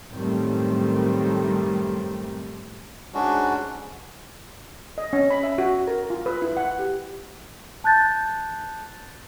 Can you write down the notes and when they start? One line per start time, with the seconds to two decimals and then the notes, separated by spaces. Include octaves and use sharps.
0.11 F#2 A2 D#3 G3 A3 C4
3.14 G#2 G#3 C#4 D4 F#4
4.98 D#5
5.13 C#4
5.30 B5
5.43 E5
5.58 F#4
5.88 A#4
6.10 F4
6.26 B4
6.42 E4
6.57 F#5
6.79 G4
7.84 A5 F#6 G6 A6